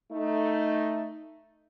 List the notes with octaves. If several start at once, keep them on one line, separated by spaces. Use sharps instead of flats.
A3 D#4